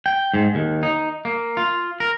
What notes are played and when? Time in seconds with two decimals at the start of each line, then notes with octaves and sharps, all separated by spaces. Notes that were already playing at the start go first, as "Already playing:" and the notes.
0.06 G5
0.34 G#2
0.55 D#2
0.83 D#4
1.25 A#3
1.57 F4
2.00 A#4